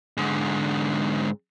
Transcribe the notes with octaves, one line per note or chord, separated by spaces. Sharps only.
G#2 D3